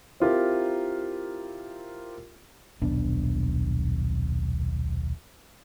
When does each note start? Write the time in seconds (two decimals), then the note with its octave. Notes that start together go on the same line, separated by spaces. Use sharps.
0.20 C4 E4 F4 G4 A#4
2.82 D#1 B1 B3 D4